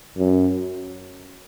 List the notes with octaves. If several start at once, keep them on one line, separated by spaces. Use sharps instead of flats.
F#2